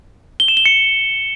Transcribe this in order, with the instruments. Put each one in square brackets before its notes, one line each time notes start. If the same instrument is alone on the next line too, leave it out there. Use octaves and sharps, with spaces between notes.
[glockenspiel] G7
E7
G7
C#7